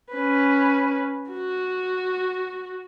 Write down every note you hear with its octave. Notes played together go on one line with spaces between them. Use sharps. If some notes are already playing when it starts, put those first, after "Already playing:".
C#4 B4
F#4